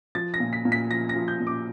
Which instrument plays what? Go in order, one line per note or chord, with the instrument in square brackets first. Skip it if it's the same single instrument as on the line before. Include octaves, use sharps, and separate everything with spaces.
[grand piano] F3 A6
A#6
A#2
B6
A#2
B6
F3 A#6
A#6
F3
G6
A#2
D6